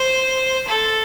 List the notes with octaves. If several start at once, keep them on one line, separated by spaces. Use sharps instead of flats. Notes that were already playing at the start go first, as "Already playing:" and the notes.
Already playing: C5
A4